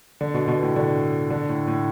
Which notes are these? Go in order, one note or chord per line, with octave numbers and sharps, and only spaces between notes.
D3
B2
B2
A2
D3
D3
A2
A2